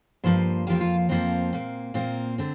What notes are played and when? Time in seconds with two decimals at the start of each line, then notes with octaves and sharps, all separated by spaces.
0.24 G2 F3 A#3 C5
0.67 F2 F3 A#3 G4
0.81 F4
1.09 F2 F3 A#3 C4
1.53 A#2 A#3
1.94 A#2 A#3 C4
2.38 D3 C4